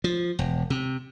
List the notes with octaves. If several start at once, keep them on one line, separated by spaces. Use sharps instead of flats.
F3
E1
C3